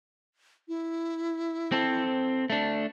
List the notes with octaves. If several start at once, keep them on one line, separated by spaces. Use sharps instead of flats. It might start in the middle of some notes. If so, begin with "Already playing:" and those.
E4
C4 A4
A3 D4